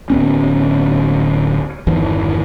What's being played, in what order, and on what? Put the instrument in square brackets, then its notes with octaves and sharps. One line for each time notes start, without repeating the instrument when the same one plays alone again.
[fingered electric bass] D1 B3 C#4
G1 E2 D#3 E3